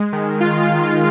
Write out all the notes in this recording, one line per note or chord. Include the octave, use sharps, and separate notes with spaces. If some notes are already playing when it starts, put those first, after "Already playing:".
Already playing: G#3
D#3
F4